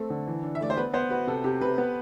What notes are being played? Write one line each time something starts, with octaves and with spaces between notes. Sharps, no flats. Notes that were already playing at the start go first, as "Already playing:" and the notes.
Already playing: A3 C4 A4
D3
E3
D4
E5
A3 D5
C5
B3 B4
B3 C5
F#4 B4
C3 A4
C3 G4
C3 B4
B3